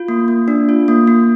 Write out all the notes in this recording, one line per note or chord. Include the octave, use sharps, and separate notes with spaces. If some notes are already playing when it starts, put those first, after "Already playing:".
Already playing: F4
A#3
A#3
D4
F4
A#3
A#3